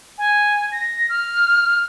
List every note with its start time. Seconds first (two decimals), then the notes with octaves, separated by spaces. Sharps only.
0.18 G#5
0.72 A#6
1.09 F6